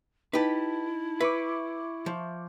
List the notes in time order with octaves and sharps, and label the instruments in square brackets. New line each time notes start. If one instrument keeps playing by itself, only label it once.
[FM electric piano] D#4 A5 [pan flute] E4 [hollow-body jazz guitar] G4 B4
[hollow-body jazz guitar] B4 [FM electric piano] E5 C#6 D6
[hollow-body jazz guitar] F3